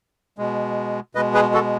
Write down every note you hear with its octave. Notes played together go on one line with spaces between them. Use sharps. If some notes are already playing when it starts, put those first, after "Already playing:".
B2 G#3
B2 G#3 B4 D#5
G#4 B4
F#4 A4